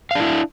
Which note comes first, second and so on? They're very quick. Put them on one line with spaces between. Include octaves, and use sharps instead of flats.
F5 D4 E4